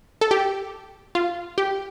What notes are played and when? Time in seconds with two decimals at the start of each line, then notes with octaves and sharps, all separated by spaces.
0.21 A4
0.31 G4
1.15 F4
1.58 G4